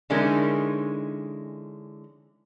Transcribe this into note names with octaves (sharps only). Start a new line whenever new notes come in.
D3 E3 G#3 C#4 D#4 A#4